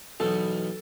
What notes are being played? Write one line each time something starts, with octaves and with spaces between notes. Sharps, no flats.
B1 E2 B2 A4